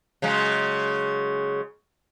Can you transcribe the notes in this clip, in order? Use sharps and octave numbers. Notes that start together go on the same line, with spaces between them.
C#3 F#3 G#3